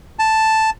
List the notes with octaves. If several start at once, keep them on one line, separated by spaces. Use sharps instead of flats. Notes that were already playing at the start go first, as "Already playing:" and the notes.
A5